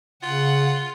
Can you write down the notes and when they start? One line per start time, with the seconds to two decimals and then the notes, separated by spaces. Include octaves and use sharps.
0.23 C#3 F4 F#5